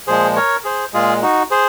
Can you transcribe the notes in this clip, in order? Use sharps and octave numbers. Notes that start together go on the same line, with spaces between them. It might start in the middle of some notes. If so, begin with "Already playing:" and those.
A#2 F3 G#3 G#4 C5
A#4 C#5
G#4 C5
A#2 G#3 F4 G#4
D#4 F#4
G#4 C5